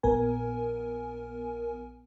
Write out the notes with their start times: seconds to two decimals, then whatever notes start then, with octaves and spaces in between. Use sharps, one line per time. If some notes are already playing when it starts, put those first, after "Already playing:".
0.03 A#1 A#2 B3 A#4 G#5